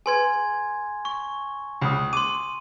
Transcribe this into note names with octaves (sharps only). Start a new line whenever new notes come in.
G#4 B4 G#5 C6 G#6
C#6
C#2 B5 D#6
C6 D6 D#7